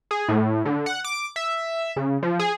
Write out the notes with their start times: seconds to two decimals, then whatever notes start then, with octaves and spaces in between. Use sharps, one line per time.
0.11 G#4
0.29 A2
0.65 D3
0.86 F#5
1.04 D6
1.36 E5
1.96 C#3
2.23 F3
2.39 G#4